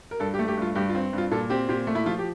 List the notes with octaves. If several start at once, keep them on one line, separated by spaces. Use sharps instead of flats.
A#4
G2 A4
G4
A3
G4
G2 F4
G2 G4
F4
C4
G2 F4
A#2 A4
C4 G4
A#2 G4
A3
E4
F3 F4
G4